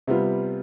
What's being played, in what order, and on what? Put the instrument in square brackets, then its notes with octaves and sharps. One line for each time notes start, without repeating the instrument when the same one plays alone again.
[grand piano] C3 G3 B3 F4